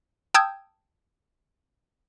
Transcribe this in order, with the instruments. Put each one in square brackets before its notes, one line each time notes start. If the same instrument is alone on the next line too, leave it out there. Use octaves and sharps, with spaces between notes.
[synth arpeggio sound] G5 A5 D#6 E6 G6 G#6